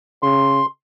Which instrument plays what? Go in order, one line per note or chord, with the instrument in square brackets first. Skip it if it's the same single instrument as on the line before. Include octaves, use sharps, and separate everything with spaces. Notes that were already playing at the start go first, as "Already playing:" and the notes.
[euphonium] C#3 [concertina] C6